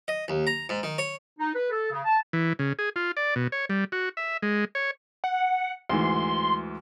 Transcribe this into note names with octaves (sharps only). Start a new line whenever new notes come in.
D#5
D#2
A#5
G#2
D#3
C#5
D#4
B4
A4
C#3
A5
E3
C#3
G#4
F4
D5
B2
C#5
G3
F#4
E5
G#3
C#5
F#5
D2 G#2 E3 C6